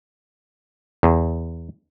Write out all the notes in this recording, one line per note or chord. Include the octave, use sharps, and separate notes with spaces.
E2